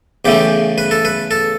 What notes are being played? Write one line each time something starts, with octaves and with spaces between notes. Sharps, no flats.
E2 C#3 E3 A3 G4
B4
A4
B4
A4